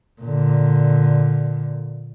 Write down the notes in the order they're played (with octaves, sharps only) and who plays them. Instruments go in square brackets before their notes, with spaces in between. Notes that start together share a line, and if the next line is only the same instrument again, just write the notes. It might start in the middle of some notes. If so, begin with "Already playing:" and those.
[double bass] A#2 D3